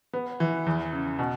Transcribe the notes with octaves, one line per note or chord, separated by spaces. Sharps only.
B3
E3
E2
C#3
B2